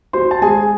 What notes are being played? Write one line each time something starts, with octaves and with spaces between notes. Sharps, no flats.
F#4 C5 C6
A5
G#3 G#4 G#5